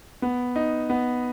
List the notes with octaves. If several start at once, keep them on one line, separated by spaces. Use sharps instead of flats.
B3
D#4
B3